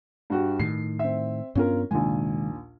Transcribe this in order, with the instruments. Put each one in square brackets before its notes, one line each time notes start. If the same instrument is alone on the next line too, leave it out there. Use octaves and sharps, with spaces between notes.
[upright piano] G2 F#4 G4
[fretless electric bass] A2 D#3 [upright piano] C7
[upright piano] C4 E5
[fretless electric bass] G2 B3 D4 [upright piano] C#4 F4 A#4
[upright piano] A#1 D#2 G#5 [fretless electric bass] C3 D#3 G#3